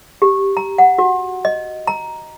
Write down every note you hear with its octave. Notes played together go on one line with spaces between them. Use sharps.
G4
A#5
F#5
F#4
D#5
A#5